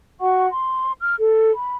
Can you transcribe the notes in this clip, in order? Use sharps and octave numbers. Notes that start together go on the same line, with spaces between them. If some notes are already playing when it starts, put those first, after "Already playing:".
F#4 F#5 C#6
C6
F6
A4
B5